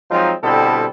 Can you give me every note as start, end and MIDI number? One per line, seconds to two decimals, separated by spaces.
0.11 0.33 53
0.11 0.33 54
0.11 0.33 56
0.11 0.33 60
0.11 0.33 63
0.11 0.33 65
0.44 0.86 47
0.44 0.86 50
0.44 0.86 55
0.44 0.86 60
0.44 0.86 64
0.44 0.86 69